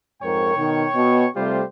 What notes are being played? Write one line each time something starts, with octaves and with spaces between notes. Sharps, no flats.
F2 G#2 A#4 C#5 G5 C#6
B2 D#3
B2
C3 G3 A3 F4 G4 C5